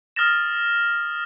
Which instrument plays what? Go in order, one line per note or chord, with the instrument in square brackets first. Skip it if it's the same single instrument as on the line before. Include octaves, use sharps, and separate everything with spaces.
[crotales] D#6 F6 A6 A#6 E7